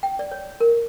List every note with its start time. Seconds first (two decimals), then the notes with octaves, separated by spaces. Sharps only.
0.03 G5
0.19 D5
0.32 C#5
0.60 A#4